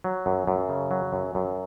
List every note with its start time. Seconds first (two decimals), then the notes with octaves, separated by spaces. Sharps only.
0.04 F#3
0.26 F#2
0.47 F#2
0.69 C#3
0.91 F#3
1.13 F#2
1.35 F#2